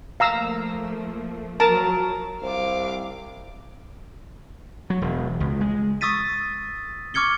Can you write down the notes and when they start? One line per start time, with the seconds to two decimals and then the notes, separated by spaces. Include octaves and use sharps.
0.20 F3 A3 A#3 F5 A#5 E6
1.60 F3 F#3 A#4 A5
2.42 C2 C5 F5 D6
4.90 F#3
5.02 E1
5.40 C#2
5.61 G#3
6.01 C#6 D#6 E6 A6 B6 D#7
7.14 C#6 D6 F6 G#6 C#7 G7